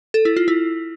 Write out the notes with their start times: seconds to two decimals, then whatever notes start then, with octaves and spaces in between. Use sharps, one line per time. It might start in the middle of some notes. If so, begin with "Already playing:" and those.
0.14 A4
0.25 E4
0.37 F4
0.48 E4